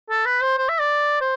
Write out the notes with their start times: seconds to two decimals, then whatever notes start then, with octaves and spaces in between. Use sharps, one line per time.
0.10 A4
0.26 B4
0.42 C5
0.58 C5
0.69 E5
0.79 D5
1.21 C5